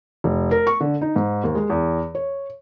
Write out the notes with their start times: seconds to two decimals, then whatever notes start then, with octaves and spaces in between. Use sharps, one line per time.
0.24 F1
0.51 A#4
0.67 C#6
0.81 D3
1.01 D#4
1.16 G#2
1.43 D#2
1.55 G#3
1.70 E2
2.15 C#5